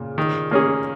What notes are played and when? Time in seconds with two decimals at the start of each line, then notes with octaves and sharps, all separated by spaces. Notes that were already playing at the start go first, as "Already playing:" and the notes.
Already playing: A#2 C#3
0.18 D#3
0.51 A#3 C#4 G#4